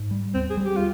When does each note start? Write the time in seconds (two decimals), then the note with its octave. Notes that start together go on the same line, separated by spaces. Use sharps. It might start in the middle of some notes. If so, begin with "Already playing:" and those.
Already playing: G#2
0.11 G3
0.34 D#2 C4
0.50 G#4
0.57 G3
0.64 G4
0.76 F4